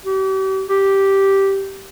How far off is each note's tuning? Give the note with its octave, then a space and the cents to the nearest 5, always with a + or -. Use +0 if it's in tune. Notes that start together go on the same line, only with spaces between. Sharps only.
G4 -40
G4 -5